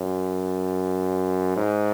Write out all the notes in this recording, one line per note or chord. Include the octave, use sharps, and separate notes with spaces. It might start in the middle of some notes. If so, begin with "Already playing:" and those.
Already playing: F#2
G#2